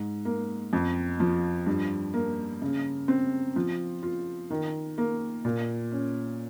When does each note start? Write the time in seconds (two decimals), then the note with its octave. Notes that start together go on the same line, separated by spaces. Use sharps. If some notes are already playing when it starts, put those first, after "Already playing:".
Already playing: G#2
0.25 A#3
0.73 F2
1.20 F3
1.66 G2
2.14 A#3
2.62 C#3
3.08 C4
3.56 F3
4.03 F4
4.50 D#3
4.98 A#3
5.45 A#2
5.92 C#4